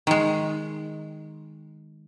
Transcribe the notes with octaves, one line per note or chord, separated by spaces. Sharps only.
D#3 G#3